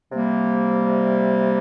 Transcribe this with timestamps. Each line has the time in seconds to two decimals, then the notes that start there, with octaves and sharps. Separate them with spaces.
0.11 C3 G3 A#3